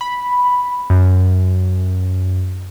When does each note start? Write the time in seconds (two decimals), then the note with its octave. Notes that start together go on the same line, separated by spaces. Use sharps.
0.01 B5
0.90 F#2